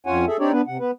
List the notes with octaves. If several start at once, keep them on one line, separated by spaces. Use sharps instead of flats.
F2 C#4 F4 C#5 F#5 G#5
G#4 A4 E5
C4 D4 D#4 G4 C#5 D5
B3 D4 B4
C3 F#5
B3 B4